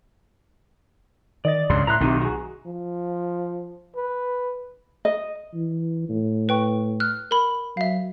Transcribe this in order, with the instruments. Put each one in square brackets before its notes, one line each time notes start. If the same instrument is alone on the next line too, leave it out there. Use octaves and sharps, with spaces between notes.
[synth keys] D#3 D#5 A6 [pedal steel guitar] D5
[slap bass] C#2 G2 C#3 [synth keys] C6
[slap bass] A2 [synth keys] B4 E5 C6 [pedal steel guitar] A#5 F#6
[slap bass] B1 D#3 [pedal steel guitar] C4 D#4 G4
[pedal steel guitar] F#4 [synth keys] G#4 A#5
[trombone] F3
B4
[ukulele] D#5
[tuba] E3
A2
[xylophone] B4 G5 C#6
F6 F#6
A#4 B5
[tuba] F#3 [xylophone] E5 F5